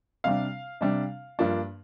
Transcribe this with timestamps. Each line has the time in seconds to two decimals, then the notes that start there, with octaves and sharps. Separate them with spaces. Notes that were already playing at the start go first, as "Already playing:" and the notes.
0.24 C3 G3 D4 F5
0.81 C3 G3 D4
1.39 G2 F3 A#3 D4